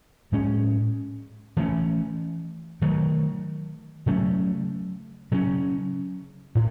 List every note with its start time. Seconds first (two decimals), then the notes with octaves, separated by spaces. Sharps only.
0.32 A2 G#3 C#4
1.57 E3 A3 C#4
2.82 D#3 F#3 A3
4.06 C#3 F#3 A3 C#4
5.31 C#3 F#3 C#4
6.55 A2